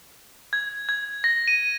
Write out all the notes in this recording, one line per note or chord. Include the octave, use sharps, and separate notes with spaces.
G#6
G#6
A#6
D#7